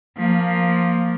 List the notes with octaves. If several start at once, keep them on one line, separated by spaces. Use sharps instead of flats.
F3 A#3